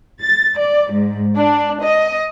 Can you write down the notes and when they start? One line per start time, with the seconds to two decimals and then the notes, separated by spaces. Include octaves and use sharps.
0.21 A6
0.59 D5
0.92 G#2
1.37 D4
1.83 D#5